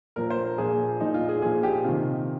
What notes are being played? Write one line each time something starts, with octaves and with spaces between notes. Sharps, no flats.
A#2 F3 A#4
C5
A#4
A#2 F3 G#4
A#2 F3 D#4
F4
G#4
A#2 F3 G#4
G4
C3 D#3 F4